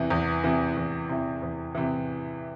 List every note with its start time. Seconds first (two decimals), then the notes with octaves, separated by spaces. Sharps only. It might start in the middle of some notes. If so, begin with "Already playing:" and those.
Already playing: E2 C3 E3
0.10 E2
0.43 C3 E3
0.77 E2
1.09 C3 E3
1.42 E2
1.75 C3 E3